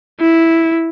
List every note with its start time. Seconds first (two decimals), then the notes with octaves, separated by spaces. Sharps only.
0.20 E4